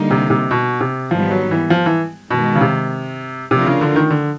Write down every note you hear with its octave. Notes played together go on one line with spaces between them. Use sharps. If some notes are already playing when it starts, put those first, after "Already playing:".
Already playing: D3 G3 A#3 D#4
C3
C3
B2
C3
G#2 D#3 F3 G3 B3
F#3
E3
F3
E3
G2 B2 D#3 G#3
C#3
C3
C3 F3 A3 D4 F4 A#4
C#3
D3
D#3
D3